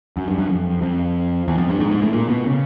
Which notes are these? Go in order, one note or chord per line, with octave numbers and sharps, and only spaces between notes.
F#2
G2
F#2
F2
F2
E2
F2
G2
G#2
G#2
A2
A#2
B2
C#3